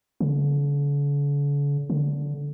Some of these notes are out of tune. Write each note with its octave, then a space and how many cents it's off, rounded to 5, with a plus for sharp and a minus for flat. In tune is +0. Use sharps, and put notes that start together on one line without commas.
D3 -45
D3 -15